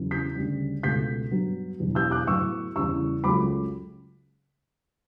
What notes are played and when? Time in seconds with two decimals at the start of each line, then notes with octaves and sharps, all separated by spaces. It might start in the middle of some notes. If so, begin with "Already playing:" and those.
Already playing: E2 C#3 F#3
0.11 G6 B6
0.35 D2 C#3 G3
0.83 C#2 B2 A3 G6 B6
1.31 G2 F#3 B3
1.80 E2 B2 F#3
1.95 E6 G6
2.11 D6 F#6
2.27 A2 F#3 B3 C#6 E6
2.76 E2 C#3 G3 C#6 E6
3.24 C#2 C#3 F#3 A3 B5 D6